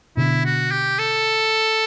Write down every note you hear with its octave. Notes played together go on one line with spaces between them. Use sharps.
B2 D3 E4
F#4
G4
A4